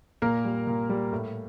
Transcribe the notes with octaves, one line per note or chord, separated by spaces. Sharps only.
A#2 A#3 A#4
G3
A#2
G3
A2